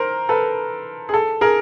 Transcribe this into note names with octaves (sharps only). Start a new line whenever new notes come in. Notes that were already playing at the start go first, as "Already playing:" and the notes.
Already playing: A#4 C5
A4 B4
G#4
A4
G#4 A#4